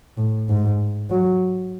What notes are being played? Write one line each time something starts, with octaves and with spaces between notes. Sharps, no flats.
A2
G#2
F#3